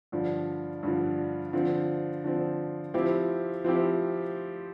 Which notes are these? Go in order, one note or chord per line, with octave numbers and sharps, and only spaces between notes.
G2 D3 F3
G2 D3 F3
D3 F3 C4
D3 F3 C4
F3 C4 E4 G4
F3 C4 E4 G4